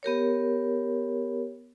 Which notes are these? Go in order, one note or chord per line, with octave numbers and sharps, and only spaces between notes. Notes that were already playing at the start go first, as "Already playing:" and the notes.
B3 G4 A#4 C#5